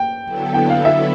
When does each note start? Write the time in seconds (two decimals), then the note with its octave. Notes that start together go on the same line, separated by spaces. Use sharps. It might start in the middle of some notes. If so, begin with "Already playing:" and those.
Already playing: G5
0.24 D3 F#3 B3 E4 A4
0.54 G5
0.70 F5
0.85 E5